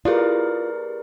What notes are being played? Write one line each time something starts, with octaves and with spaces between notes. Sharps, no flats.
E4 F4 G4 G#4 A#4 B4 D5